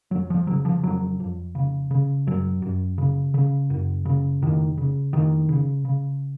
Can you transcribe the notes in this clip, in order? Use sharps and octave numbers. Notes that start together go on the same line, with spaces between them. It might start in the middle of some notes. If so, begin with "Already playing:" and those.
F2 F#3
F3
C#3 F#3
F3
F2 F#3
F2
C#3
C#3
F#2 F#3
F#2
C#3
C#3
F#2
C#3
F2 D#3
C#3
F2 D#3
C#3
C#3